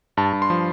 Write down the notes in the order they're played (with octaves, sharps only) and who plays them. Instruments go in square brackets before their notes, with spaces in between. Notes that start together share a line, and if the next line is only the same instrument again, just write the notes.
[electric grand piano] G2 A5
G2
C6
F3